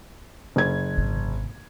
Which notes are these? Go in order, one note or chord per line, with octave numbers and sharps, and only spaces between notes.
F#1 G#6
G#1 C3